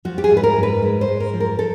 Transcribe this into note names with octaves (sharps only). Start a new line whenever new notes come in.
F3 F#4
G4
G#4
G#2
B4
A#4
G#2
B4
G#3
C5
G#2
A#4
F3
A#4
A4